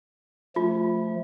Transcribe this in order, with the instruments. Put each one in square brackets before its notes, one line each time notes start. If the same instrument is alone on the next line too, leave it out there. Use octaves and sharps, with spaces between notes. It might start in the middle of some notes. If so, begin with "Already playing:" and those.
[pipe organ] F3 A3 [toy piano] F4